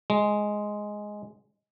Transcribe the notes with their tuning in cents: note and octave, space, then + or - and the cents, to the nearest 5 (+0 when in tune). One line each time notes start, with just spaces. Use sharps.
G#3 +5